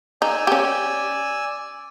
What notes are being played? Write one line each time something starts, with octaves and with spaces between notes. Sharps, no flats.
D#4 D5 G#5 E6
C#4 G4